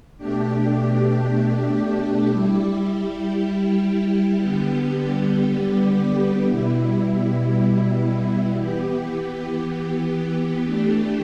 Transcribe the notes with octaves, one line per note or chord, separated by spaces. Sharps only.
B2 A3 D4 G4
G3 E4 G4
D3 G3 B3 G4
B2 G3 E4
E3 B3 G4
E3 A3 D4 G4